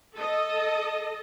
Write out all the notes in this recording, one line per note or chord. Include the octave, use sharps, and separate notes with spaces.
A4 D#5